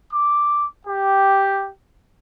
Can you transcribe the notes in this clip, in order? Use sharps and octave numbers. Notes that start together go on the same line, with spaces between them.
D6
G4